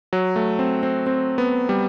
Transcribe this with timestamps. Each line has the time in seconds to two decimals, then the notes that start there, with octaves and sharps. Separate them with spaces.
0.13 F#3
0.36 A3
0.59 C4
0.83 C4
1.07 C4
1.38 B3
1.69 G3